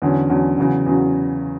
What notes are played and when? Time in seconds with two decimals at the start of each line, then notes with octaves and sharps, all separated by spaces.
0.02 E2 D3 F#3 C#4
0.30 E2 D3 F#3 C#4
0.58 E2 C#3 F#3
0.86 E2 C#3 F#3